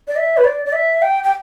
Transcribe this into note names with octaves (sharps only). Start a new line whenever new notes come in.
D5
E5
B4
D5
D5
E5
G5
G5